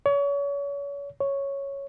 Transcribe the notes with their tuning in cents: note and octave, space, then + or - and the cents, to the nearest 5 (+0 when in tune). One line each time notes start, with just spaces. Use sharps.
C#5 +35
C#5 +0